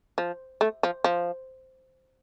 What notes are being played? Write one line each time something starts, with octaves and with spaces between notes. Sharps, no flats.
F3
A3
F3
F3